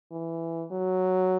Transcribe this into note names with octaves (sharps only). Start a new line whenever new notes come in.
E3
F#3